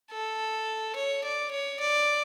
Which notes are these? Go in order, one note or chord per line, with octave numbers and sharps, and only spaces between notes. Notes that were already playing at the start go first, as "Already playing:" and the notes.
A4
C#5
D5
C#5
D5